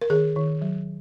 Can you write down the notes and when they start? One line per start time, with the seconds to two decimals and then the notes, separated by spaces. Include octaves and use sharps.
0.01 A#4
0.10 D#3 G#4
0.36 D#3
0.62 F#3